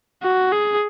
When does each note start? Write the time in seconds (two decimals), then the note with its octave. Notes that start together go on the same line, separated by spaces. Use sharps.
0.22 F#4
0.52 G#4